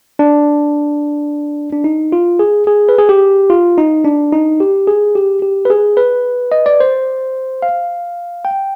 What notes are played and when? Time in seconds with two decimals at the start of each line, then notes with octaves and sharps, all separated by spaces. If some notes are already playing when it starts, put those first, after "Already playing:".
0.19 D4
1.73 D4
1.84 D#4
2.12 F4
2.39 G#4
2.67 G#4
2.89 B4
2.98 G#4
3.09 G4
3.50 F4
3.78 D#4
4.05 D4
4.32 D#4
4.60 G4
4.87 G#4
5.15 G4
5.42 G4
5.65 B4
5.70 G#4
5.97 B4
6.52 D#5
6.66 D5
6.80 C5
7.62 F5
8.45 G5